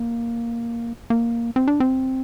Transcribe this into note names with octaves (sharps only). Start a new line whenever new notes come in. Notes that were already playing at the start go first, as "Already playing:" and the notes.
Already playing: A#3
A#3
C4
D4
C4